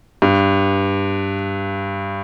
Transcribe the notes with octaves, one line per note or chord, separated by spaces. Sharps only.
G2